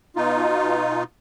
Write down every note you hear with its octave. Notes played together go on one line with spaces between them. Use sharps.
B2 D#4 F4